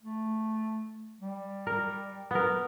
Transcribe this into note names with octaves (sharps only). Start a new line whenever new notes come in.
A3
G3
A#4
B3 A#4